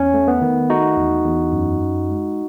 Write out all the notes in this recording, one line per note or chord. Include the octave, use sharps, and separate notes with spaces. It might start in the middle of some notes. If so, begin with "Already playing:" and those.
Already playing: E2 C#4
A3
B3
D#3
A3 D#4 F#4
E2
E2
F#2
F#2
G#3